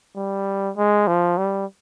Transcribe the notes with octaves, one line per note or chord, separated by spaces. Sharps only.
G3
G#3
F3
G3